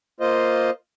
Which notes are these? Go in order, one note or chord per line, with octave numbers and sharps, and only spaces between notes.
A#3 F4 C5 D#5